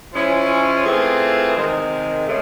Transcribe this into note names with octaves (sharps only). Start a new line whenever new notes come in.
F3 G#3 C#4 E4
E3 A3 C4 F4 G#4
C3 D#3 G#3
C#3 A3